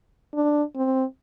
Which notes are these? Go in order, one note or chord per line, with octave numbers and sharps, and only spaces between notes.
D4
C4